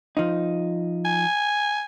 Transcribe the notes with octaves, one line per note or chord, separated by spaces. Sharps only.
F3 D#4
G#5